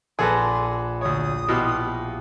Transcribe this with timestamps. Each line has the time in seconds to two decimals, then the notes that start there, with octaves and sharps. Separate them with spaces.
0.19 A#1 G#4 A4 B4 C6 A#6
1.01 D2 C#5 D#6
1.48 B2 E4 F4 G4